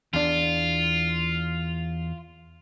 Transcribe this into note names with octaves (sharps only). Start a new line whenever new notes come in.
E2 D4 F4